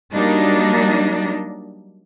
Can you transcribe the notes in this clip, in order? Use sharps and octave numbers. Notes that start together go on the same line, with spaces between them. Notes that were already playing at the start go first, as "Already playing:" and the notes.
F#3 G3 A#3 D4 D#4